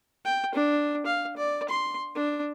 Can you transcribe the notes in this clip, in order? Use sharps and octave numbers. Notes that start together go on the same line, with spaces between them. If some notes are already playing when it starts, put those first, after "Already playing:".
G5
D4
F5
D5
C6
D4